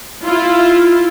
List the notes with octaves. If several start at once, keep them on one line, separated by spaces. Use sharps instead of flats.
E4 F4